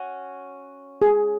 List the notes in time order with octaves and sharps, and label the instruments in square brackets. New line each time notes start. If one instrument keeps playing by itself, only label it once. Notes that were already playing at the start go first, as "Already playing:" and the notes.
Already playing: [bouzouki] C#4 F#4
[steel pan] G#4